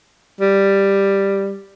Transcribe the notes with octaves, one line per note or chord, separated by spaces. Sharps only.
G3